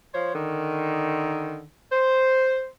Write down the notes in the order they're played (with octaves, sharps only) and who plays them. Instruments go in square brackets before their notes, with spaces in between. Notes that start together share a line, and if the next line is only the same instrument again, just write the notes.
[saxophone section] F3 C5 C#5
D3 D#3
C5